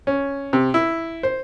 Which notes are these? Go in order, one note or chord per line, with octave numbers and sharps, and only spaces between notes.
C#4
C3
E4
C5